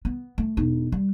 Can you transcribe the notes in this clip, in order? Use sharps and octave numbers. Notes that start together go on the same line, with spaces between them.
B3
A3
E1 D#4
G3